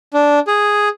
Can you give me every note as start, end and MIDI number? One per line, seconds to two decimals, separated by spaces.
0.14 0.39 62
0.47 0.89 68